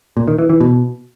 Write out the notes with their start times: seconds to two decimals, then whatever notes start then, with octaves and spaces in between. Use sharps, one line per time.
0.17 A#2
0.28 D#3
0.39 E3
0.50 E3
0.61 B2